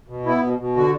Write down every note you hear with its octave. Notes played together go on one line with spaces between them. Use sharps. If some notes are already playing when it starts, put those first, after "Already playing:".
B2
B3 E4
B2
B2
D3 F#4